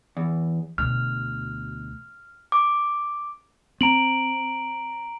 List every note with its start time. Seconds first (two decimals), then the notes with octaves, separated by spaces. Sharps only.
0.17 E2
0.78 D2 B2 F6
2.52 D6
3.81 C4 A#5 D7 F#7